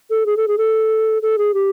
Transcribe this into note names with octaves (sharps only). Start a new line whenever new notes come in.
A4
G#4
A4
G#4
A4
A4
G#4
G4